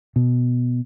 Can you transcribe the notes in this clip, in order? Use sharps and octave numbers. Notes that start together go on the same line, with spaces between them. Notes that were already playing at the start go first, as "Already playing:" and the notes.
B2